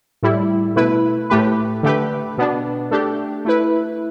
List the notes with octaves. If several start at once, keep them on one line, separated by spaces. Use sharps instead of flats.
A2 G3 E4
B2 A3 E4 B4
A2 A3 G4 B4
D3 A3 G4 B4
B2 B3 D4
A3 D4 G4
A3 E4 B4